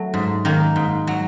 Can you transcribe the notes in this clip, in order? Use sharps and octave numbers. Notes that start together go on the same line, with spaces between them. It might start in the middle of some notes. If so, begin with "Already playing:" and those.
Already playing: F#3 A3
G#2
D#3 A#3
G#2
F#3